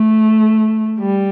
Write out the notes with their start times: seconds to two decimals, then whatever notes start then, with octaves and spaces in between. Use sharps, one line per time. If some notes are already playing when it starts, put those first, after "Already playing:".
Already playing: A3
1.00 G3